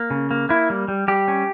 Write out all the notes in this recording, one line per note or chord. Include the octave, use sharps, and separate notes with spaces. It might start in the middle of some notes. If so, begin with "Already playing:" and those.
Already playing: A#3
C#3
A#3
A#3 E4
G3
G3
G3 G4
C#4